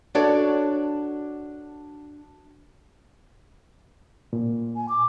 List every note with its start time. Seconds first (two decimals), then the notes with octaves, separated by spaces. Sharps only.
0.15 D4 F#4 A4 C#5 D5
4.33 A#2
4.76 G#5
4.89 D6